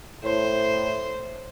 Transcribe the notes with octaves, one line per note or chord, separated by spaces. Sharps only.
A2 C5